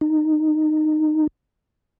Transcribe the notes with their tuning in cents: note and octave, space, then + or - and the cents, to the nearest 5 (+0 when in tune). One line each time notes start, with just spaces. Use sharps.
D#4 -15